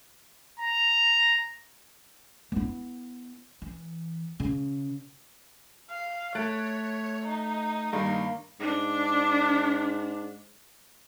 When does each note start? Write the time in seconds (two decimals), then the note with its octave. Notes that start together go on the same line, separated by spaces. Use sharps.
0.60 A#5
2.52 B3 E4
3.62 E3
4.40 C#3
5.90 F5
6.35 A3 C#5 F#6 A6 D7
7.26 D#4
7.93 G2 D#3 A#3
8.60 G#2 D4